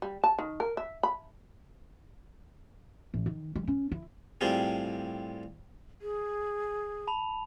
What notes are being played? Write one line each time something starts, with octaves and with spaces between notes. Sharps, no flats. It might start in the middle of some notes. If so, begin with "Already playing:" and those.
G3
A5
D#3
A#4
E5
B5
A1
D#3
G3
C#4
E4
A2 G3 C4 F4 G#4
G#4
A5 B5 F7